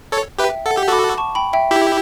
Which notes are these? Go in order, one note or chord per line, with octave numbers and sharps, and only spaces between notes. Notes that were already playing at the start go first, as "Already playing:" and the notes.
A4 C#5
G4 B4 E5 G5
A4 F#5
G4
F#4 A4 B5 D6
A5 C#6
G5 B5
E5 G5
E4 G4 E5